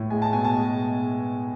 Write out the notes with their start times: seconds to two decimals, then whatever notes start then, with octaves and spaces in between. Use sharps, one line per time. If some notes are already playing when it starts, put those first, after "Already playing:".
Already playing: A2
0.10 G#3 G#5
0.22 A5
0.33 B2 G#5
0.44 A5
0.57 G#3